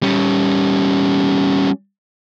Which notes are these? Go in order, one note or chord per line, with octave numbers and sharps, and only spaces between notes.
G3 C#4